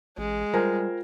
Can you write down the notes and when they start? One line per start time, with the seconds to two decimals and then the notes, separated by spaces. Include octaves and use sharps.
0.18 A1 G#3
0.54 G3 F4 A#4 C5 G5 G#5